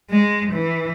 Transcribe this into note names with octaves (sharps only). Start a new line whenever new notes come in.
G#3
E3